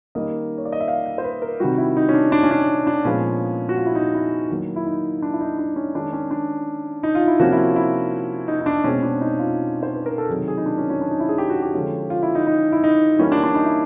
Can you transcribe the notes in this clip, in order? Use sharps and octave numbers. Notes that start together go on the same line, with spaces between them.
D#3 G3 A#3 C#4 D#5
C#5
D5
D#5
E5
F5
F5
C5
B4
A#4
C3 D#3 G3 F#4
E4
D#4
C#4
D4
D4
C#4
D4
D4
A#2 F3 G#3 B3 C#4
F#4
F4
E4
D#4
E4
D#3 F#3 A#3
E4
D#4
D4
E4
D#4
D4
C#4
D#3 G#3 C#4 D4
C#4
D4
D#4
F4
E4
C3 F3 A#3 C#4 F#4
E4
F4
E4
D#4
D#4
D4
B2 G#3 C4 C#4
D4
D#4
F4
C5
B4
A#4
A4
C3 D#3 F#3 G#4
G#4
D#4
D4
C#4
C#4
D4
D#4
E4
G#4
G4
F#4
G4
D3 F3 G#3 C#4
F4
E4
D#4
D#4
E4
D#4
E3 G3 A#3 C#4
D4
D4
D#4
E4